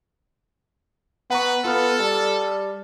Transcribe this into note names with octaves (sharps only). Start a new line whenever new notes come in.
B3 B4 F#5 A#5 C#6
B3 F4 A4 F6
G3 A5